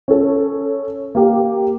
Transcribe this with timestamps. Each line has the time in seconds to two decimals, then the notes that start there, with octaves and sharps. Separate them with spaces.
0.08 C#4 A4
1.15 A#3 G4